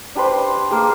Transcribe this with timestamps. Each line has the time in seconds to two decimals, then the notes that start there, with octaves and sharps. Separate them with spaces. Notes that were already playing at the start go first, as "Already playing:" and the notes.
0.15 D4 G4 B4 C5
0.70 A#3 G4 G#4